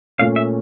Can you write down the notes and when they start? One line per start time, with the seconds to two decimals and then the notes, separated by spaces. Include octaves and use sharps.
0.19 A#2 A3 C#4 F5
0.36 E5